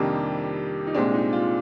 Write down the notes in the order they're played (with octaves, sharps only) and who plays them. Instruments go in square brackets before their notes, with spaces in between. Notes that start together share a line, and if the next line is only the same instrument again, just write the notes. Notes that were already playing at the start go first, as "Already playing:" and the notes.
Already playing: [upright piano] F2 C3 D#3 G3 A#3 D4
D#4
C2 A#2 G#3 C4 D4
D#4
F4